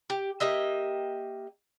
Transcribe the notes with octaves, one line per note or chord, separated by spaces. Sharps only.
G4
A#3 G4 D#5 E5